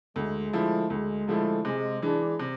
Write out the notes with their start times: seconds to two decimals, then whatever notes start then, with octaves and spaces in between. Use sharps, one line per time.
0.16 D2 G#3
0.53 D3 F3 A3 E4
0.90 D2 G#3
1.28 D3 F3 A3 E4
1.65 C3 G#3
2.02 E3 G#3 D4
2.40 C3